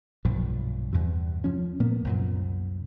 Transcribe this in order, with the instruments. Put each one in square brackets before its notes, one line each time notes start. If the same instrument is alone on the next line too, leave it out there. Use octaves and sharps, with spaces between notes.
[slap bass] B1 G2 A#2 F3
E2 G2 C3
F3 C#4
A#2 A#3 B3
C2 F#2 A#2